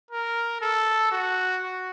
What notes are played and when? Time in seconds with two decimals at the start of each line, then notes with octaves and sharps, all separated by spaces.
0.11 A#4
0.61 A4
1.12 F#4
1.62 F#4